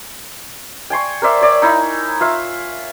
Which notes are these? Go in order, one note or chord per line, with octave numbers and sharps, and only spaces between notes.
G5 G#5 C6 C#6
A#4 C5 D5 E5
C#5 D5
D#4 E4
F4 E5 F5